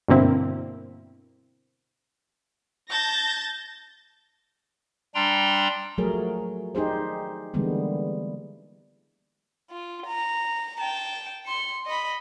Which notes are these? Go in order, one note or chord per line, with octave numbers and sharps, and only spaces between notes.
G2 B2 D3 A#3 C4 E4
A5 G6 A6 A#6
G3 D4 G5 A#5 C6
F3 F#3 A3 G#4 A#4 C#5
D#4 G4 G#4 C5
D3 E3 G3 G#3 A#3 B3
F4
A#5
G5 A5
C6 C#7
D#5 B5